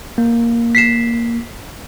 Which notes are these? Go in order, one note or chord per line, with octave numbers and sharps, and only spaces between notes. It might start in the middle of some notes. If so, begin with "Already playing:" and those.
A#3
B6 C7 E7